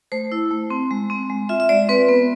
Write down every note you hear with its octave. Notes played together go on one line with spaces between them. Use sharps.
A3 C5
E4
A3
C4
G#3
C4
G#3
F4 E5
E5
G#3 D5
C4 B4
B3